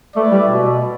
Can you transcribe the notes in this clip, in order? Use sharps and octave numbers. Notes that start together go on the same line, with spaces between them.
A3 E4 B4 D5
G3
B2